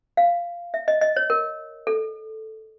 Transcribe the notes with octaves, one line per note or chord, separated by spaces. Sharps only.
F5
E5
D#5
D#5
C#5
A#4
A4